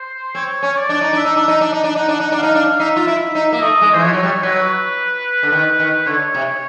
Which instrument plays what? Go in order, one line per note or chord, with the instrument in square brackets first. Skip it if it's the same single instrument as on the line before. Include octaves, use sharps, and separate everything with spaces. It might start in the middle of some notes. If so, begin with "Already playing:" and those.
Already playing: [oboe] C5
[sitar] C4 [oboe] C#5
[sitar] C#4
[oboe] D5
[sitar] D4
D#4
[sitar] D4 [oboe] E5
[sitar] D#4
D4
D#4
D4
D#4
D4
[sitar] D#4 [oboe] F#5
[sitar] D4
D#4
D4
[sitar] D#4 [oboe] F5
[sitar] D4
[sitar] D#4 [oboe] E5
[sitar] F4
E4
D#4
A#3
[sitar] A3 [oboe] D#5
[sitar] G#3
[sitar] E3 [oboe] C5
[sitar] F3 [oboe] C#5
[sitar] F#3
G3
[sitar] F#3 [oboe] B4
[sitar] D3
D#3
D#3
[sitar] D3 [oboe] C#5
[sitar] C3